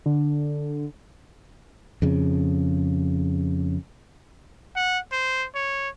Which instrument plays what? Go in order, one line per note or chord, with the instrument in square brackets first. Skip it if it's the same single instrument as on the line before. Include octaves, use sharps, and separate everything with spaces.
[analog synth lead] D3
[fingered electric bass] F2 C#3
[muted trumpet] F#5
C5
C#5